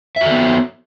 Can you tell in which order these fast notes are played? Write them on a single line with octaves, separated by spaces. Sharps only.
E5 F#4 A4 B3